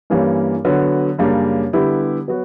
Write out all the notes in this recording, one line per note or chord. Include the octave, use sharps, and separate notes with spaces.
G2 E3 G3 A#3 C#4
D3 F#3 B3 F#4
F#2 C#3 G3 A#3 D4
D3 G3 B3 E4 G4
F#3 B3 F#4